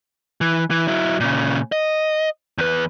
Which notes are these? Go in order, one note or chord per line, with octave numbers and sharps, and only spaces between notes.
E3
E3
F#3 E4
A#2 C#3
D#5
E2 B4